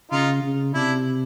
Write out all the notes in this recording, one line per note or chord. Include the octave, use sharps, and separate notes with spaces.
C#3 D#4 F4
C#3
C3 D4 E4